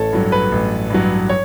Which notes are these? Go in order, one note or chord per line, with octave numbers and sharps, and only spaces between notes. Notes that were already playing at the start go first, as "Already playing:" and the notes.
Already playing: A1 A4 C#5
G2 F#3
B4
A1
G2 F#3
C#5